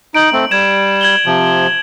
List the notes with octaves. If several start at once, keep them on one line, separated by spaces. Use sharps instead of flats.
D#4 D7 F#7
A3 C4
G3 G#6 E7
G#6 F#7 G7
C3 F3